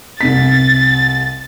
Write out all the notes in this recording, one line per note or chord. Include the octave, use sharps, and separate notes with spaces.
C2 C3 A6 B6